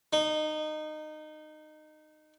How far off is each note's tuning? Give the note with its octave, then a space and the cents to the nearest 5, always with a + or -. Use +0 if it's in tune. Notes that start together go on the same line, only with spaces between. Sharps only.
D#4 -20